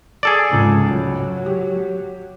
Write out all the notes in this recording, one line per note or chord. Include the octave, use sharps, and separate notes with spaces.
G#4 A4 D5
F1 C#2 G#2
F#3
G4